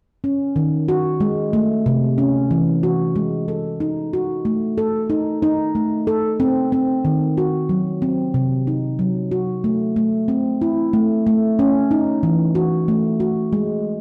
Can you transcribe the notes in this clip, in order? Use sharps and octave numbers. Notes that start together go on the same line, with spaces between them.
C#4
D#3
F#4
G#3
A3
C3
C#4
E3
F#4
G#3
A4
D#4
F#4
A3
A4
D#4
D#4
A3
A4
C4
C4
D#3
F#4
F#3
C4
C3
D#4
F#3
F#4
A3
A3
C4
E4
A3
A3
C#4
D#4
E3
F#4
A3
F#4
G#3